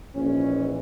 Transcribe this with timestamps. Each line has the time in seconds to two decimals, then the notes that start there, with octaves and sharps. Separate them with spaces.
0.15 A#1 G#2 E3 C#4